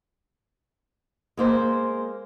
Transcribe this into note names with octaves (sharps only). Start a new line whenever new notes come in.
G#3 A#3 C5